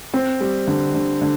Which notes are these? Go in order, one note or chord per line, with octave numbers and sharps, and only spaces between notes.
C4
G3
D3
D3
D3